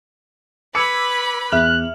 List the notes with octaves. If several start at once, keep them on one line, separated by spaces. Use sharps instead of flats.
B4 B5 D6 E6 G#6 C#7
E2 E5 F6 F#6 F#7